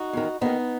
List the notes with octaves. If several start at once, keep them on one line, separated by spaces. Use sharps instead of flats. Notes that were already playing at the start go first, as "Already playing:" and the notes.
Already playing: D#4 F#4
E2 D#3
D#2 D#3 B3 D#4